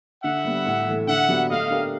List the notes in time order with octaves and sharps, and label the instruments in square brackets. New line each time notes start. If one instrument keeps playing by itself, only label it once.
[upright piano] D3 [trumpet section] E5 F#5
[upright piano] G3 B3
A2
E3 A3
[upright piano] D3 [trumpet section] E5 F#5
[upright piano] F#3 B3 D4 G4
[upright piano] A3 [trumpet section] D#5 F5
[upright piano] D4 G4 A#4